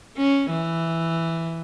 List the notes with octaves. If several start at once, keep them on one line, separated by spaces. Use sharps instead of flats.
C#4
E3